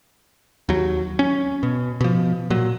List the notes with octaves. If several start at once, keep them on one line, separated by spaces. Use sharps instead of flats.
D#2 F#3
C#4
B2
B2 F3
A#2 F#3